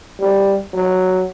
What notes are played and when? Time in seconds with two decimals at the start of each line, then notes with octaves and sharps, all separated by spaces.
0.20 G3
0.74 F#3